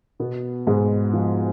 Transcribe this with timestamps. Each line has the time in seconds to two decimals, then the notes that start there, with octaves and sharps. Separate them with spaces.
0.20 B2 B3
0.67 G#2 G#3
1.13 F3